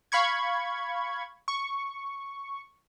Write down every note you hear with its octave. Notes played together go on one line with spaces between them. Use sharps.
F5 B5 C#6 G#6
C#6